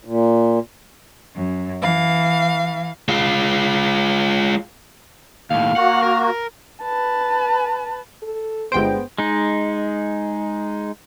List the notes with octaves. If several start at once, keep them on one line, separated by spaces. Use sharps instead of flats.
A#2
F#2
E3 F5
G#3 F4
D#2 A2 F5
A#3 F#4 F#5
A#4
B4 A5
A4
G1 G3 G#3 B3 G4 C5 G5 D7
G#3 D#4